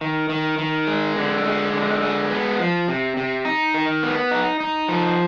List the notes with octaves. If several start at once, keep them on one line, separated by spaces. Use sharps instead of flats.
D#3
D#3
D#3
G#3
D3
G#3
D3
G#3
B3
F3
C3
C3
D#4
D#3
B3
D#4
D#4
F3